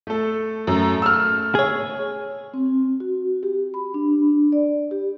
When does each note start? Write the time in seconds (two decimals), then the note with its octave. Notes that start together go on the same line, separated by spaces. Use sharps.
0.07 A3 A4
0.67 F#2 A3
1.02 E6 F6
1.55 G#4 C#5
2.54 C4
3.00 F#4
3.43 G4
3.74 B5
3.94 D4
4.52 D5
4.91 G4